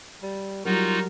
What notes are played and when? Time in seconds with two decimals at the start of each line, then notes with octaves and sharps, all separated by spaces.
0.23 G3
0.65 F#3 G3 D#4 F4 F#4 A#4